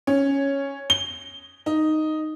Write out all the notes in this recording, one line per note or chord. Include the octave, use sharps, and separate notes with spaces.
C#4
G7
D#4